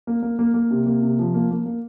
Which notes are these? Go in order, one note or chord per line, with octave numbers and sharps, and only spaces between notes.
A#3
A#3
A#3
A#3
C3
A#3
C3
F3
A#3
A#3
A#3